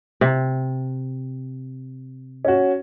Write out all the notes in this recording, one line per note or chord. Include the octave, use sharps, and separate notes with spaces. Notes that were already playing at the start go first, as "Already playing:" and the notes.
C3
C#4 F#4